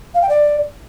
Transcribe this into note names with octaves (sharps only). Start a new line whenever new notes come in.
F5
G5
D5